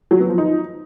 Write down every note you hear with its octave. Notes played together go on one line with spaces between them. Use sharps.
F#3
B3
F3
D#4